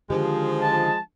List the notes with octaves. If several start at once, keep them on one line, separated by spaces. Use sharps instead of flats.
D3 D#3 F3 G#3 G4
A5